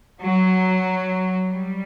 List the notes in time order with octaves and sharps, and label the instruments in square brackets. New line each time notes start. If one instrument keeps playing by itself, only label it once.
[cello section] F#3
G3